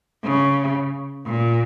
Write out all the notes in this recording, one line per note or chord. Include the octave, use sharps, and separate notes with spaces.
C#3
A#2